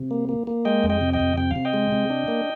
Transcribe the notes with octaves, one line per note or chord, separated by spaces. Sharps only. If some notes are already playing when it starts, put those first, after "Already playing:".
Already playing: C3
A#3
A#3
A#3
G#3 D#5 G5
F2
D#5 G5
C3
D#5 G5
F2
C3 G5
C3 F5
D#5 G5
G#3
C3
D4
A#3